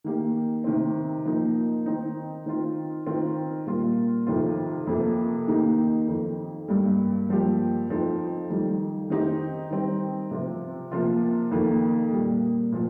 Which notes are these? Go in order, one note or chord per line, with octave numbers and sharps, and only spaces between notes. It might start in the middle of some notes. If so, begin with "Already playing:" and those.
D#3 A#3 G4
C3 D#3 C4
F3 A#3 D#4
D#3 C4 D#4
D#3 C4 F4
D#3 C4 F4
A#2 G3 A#3 F4
F2 C3 D#3 C4 F4
F2 C3 F3 A#3
D#3 A#3 D#4 G4
F2 D#3 C4
G2 G3 A#3
G2 F3 A#3 G4
F2 F3 C4 D#4
F2 D#3 G3
D#3 C4 D#4 G4
D#3 G3 C4
C3 F3 C4 F4
C3 F3 A#3 F4
F2 D#3 A#3
A#2 G3 A#3
A#2 F3